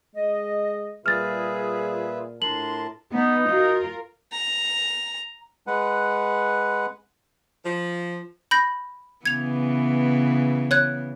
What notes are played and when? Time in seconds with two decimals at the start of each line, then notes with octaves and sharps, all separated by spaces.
0.15 G#3 D#5
1.06 A#2 G3 F4 G#4 B4 E5 F6 A6
2.42 A2 D4 F4 A#4 A5 C6 F#7
3.14 B3 D#4
3.50 F4 F#4 A#4
4.32 A#5
5.67 G#3 B4 F#5
7.65 F3
8.51 B5 G6 A#6
9.26 C#3 E3 B3 G#6 F7
10.71 C#5 F#6 G#6